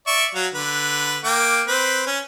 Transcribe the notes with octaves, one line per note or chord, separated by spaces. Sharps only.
D5 E5 C#6
F#3 F#4 F5
D3 B4
A#3 G5 D6
C4 B4
C#4